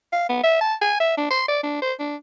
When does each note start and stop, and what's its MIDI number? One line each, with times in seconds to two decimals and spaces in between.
0.13 0.28 77
0.29 0.40 59
0.44 0.59 76
0.61 0.75 81
0.82 0.99 80
1.00 1.15 76
1.18 1.27 62
1.31 1.47 84
1.48 1.60 74
1.63 1.78 62
1.82 1.93 72
2.00 2.16 62